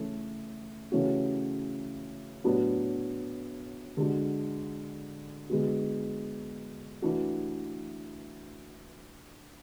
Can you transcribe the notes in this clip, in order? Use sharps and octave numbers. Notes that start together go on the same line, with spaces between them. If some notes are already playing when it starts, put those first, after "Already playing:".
Already playing: C#3 E3 A3 C#4
C#3 E3 A3 C#4 F#4
A2 F#3 B3 D4 F#4
D3 G#3 D4 F#4
D3 G#3 B3 F#4
E3 A3 D4 F#4